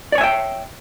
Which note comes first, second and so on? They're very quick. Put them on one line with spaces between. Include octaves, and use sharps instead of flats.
D5 C#5 G#5 E5 G5